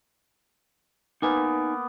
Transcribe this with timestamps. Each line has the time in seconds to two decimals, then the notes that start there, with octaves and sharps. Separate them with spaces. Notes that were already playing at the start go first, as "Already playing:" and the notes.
1.22 A#3 B3 D#4 G#5